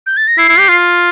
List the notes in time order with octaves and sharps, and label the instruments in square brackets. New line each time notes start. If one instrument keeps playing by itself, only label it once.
[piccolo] G6
A6
A#6
[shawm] E4 [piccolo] C7
[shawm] E4
G4
F4